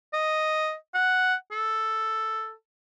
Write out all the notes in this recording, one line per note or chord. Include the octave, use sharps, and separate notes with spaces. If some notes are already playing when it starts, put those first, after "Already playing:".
D#5
F#5
A4